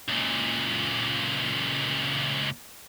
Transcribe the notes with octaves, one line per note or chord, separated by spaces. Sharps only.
C#2 A#2